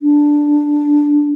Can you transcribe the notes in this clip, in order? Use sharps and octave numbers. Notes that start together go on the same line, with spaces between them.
D4